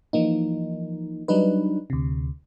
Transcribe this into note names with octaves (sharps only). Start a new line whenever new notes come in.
E3 F3 A#3 D#4
F#3 G3 D4 D#4 B4
D2 C3